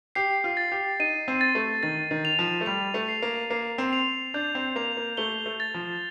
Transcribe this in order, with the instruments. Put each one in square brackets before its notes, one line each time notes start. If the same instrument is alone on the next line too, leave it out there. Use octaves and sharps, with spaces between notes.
[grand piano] G4 [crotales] C7
[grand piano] F4
[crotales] A6
[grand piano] G4
[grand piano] D#4 [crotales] D#7
[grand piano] C4
[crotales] A6
[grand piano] A3
[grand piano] D#3 [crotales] A6
[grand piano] D#3
[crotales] F7
[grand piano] F3
A3
[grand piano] G3 [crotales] F7
[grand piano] A3
[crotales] C7
[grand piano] A#3
[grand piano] A#3 [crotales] C7
[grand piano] C4
[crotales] F7
[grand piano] D4 [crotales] G6
[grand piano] C4
[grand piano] A#3 [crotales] F7
[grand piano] A#3
[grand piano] A3 [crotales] G7
[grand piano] A3
[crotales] A6
[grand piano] F3